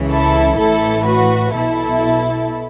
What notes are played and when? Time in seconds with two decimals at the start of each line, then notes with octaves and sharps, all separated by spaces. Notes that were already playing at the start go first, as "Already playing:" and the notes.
Already playing: C#2 C#3 E3
0.09 E4 A4
0.58 A1 A2 E3 E4 A4
1.06 F#4 B4
1.54 B1 B2 E4 A4